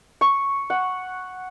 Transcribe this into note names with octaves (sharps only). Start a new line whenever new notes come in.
C#6
F#5